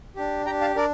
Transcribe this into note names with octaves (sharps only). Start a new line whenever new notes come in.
D4 G4
D4 G4 G5 A#5
F5 A5
D4 A#4 D5